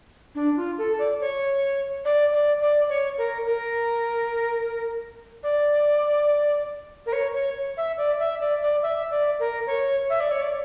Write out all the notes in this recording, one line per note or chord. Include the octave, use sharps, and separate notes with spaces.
D4
F4
A4
D5
C#5
D5
D5
D5
C#5
A#4
A#4
D5
A#4
C#5
C#5
E5
D5
E5
D5
D5
E5
D5
A#4
C#5
E5
D5
C#5
D5